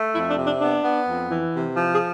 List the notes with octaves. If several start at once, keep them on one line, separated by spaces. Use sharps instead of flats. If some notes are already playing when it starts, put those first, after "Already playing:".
Already playing: A3
F2 E4
D4
C3
D4
B3 D4
B3
F2
E3
C3
F3
G#4